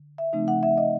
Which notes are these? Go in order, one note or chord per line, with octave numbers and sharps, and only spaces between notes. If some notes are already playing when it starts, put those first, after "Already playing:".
Already playing: D3
E5
C#3 F3 A3 C4 D#4
F#5
E5
D#5